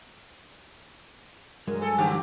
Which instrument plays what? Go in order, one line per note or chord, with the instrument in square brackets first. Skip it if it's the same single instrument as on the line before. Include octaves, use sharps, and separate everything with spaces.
[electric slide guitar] G2 F#3 G#3 [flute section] A#4
[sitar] A4 [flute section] G#5
[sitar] D3 F3 G4